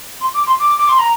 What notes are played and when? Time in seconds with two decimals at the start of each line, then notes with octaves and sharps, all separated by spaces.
0.21 C6
0.34 D6
0.47 C6
0.60 D6
0.78 D6
0.89 C6
0.99 A#5